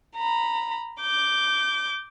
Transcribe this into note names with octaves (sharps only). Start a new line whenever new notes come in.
A#5 B5
D6 G6